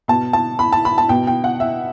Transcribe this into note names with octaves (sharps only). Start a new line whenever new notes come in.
B2 A5
A5
B5
A5
B5
A5
B2 G5
G5
F#5
E5